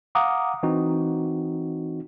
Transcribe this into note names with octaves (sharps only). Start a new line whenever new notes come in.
F5 F#5 A#5 D6 D#6
E3 C4 D#4 F#4